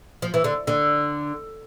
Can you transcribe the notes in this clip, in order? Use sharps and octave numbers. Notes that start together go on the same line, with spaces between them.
F3
E3
D3
D3